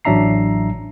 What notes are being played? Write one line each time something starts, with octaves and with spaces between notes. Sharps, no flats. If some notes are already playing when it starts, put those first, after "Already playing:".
A1 F#3 D4 E5 A#5 C7